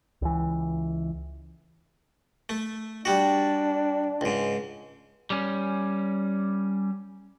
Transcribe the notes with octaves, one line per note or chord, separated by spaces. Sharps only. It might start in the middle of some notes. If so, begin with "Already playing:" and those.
C#2 E3
A3
G3 D4 F#4
C#2 G#2
G3 C#4